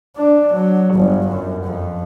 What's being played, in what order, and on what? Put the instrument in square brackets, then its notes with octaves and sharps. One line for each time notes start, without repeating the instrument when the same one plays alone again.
[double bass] D4
F#3
G1
F#2
F2